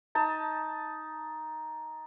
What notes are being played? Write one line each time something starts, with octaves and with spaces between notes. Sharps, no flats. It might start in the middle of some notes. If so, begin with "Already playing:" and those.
D#4 A5